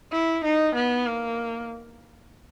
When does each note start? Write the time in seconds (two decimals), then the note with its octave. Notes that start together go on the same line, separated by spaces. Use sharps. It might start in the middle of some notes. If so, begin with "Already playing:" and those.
0.12 E4
0.44 D#4
0.75 B3
1.07 A#3